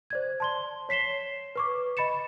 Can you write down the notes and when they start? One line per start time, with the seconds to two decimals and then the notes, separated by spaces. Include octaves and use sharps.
0.10 C5 D5 G#6
0.40 A5 C6 G7
0.89 C#5 B6 C7 E7 G7
1.56 B4 C#6 D6
1.97 D#5 B5 A6 C#7 E7